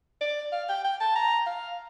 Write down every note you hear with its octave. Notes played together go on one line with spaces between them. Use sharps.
D5
F5
G5
G5
A5
A#5
F5